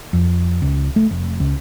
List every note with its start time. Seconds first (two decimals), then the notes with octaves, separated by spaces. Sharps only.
0.13 F2
0.62 C#2
0.96 A3
1.11 F1
1.40 C#2